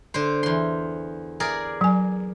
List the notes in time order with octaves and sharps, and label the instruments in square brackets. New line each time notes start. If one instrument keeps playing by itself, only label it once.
[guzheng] D3 C5
E2 C6
G#4 A#4 D5
[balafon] F#3 G#5